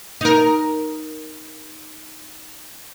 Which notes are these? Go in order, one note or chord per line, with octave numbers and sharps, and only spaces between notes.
D#4 A#4